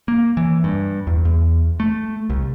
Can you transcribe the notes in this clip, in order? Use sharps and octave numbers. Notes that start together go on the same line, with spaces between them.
A#3
E3
G2
E2
E2
A3
C2